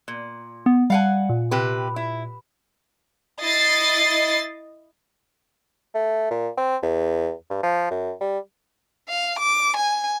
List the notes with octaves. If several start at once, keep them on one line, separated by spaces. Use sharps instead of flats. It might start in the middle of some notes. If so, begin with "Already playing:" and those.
A#2
B3
G3 F5 F#5 G#5
A#2
C3 G4 B4
E4
E4 D#5 A6 C7
A3
A#2
C4
E2
G2
F3
F#2
G3
F5
D6
G#5